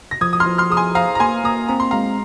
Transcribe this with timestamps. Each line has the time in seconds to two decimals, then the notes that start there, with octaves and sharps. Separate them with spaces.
0.11 A#6
0.21 F3 D#6 G#6
0.33 D#6
0.40 C6 F6
0.46 F3
0.58 C6 F6
0.70 G#4 D#6
0.77 G#5 C6
0.95 C5 F5 A#5
1.15 A#5
1.20 A#3 G#5 C6
1.44 A#3 A#5 D#6
1.69 C4 A#5
1.80 C6
1.91 G#3 F5 A#5